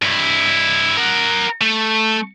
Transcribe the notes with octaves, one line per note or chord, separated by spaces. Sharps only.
G2 E4
A#4 F#5
A3